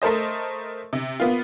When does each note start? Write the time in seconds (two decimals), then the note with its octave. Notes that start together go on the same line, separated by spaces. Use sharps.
0.02 A3 A4 A#4 C5 D#5
0.93 C3
1.20 A#3 B3 F4